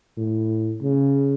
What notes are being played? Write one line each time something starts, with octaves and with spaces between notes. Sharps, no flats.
A2
C#3